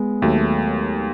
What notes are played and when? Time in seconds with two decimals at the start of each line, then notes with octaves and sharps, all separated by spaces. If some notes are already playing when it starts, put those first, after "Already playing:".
Already playing: G#3 B3
0.22 D#2 F#3 A3